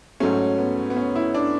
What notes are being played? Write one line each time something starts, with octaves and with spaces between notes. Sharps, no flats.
G#2 F#3 A3 C#4
B3
B3
C#4
E4
D4